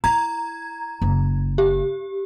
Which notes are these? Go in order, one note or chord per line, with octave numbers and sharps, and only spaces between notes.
E4 A#5 G#6
F#1
G4